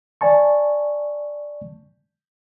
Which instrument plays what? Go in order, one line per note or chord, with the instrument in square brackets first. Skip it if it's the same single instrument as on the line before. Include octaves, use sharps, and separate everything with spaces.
[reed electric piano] D5 G#5 A5 C#6